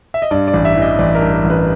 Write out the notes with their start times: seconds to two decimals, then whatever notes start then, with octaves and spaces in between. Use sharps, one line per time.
0.14 E5
0.22 D#5
0.31 G2 D5
0.48 D5
0.53 A1
0.65 E5
0.76 E3
0.82 D#5
0.99 A1 D5
1.15 A#4
1.21 G2
1.32 A#4
1.44 A1
1.50 B4